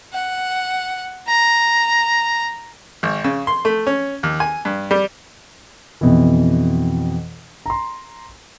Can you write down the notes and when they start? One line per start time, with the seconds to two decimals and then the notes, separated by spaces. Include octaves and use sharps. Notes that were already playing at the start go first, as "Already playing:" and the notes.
0.13 F#5
1.28 A#5
3.03 G#1
3.24 C#3
3.47 C6
3.65 A3
3.87 C#4
4.23 D#2
4.40 G#5
4.65 G2
4.91 G3
6.01 F2 B2 E3
7.66 A#5 C6